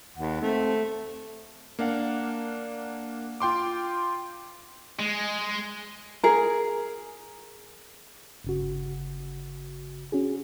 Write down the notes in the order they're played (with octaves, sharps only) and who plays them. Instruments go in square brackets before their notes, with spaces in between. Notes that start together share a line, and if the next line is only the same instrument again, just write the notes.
[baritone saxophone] D#2 [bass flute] F#5
[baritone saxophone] A3 [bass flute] C4
[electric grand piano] A#3 D4 F5 F#5
F4 G5 C6 D6
[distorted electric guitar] G#3
[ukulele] G#4 A#4
[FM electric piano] G1 C#3 F#4
C#4 F#4 G#4